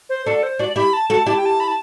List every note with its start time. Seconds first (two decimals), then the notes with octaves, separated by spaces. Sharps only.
0.10 C5
0.26 D4 F#4 A4
0.43 C5
0.59 D4 F#4 D5
0.76 E4 G4 B5
0.93 A5
1.10 F#4 A4 A5
1.26 E4 G4 A5
1.37 G5
1.46 A5
1.60 B5
1.68 A5